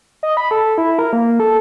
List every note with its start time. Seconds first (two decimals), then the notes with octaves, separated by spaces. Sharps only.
0.23 D#5
0.37 B5
0.51 A4
0.78 E4
0.99 A#4
1.13 A#3
1.40 A4